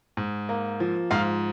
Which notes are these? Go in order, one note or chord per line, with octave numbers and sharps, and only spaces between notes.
G#2
A#3
F3
G#2 F4 F5